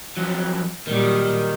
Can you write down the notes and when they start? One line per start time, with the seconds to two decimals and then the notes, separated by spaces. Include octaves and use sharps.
0.17 F2 F#3
0.87 A#2 D#3 F#3 G3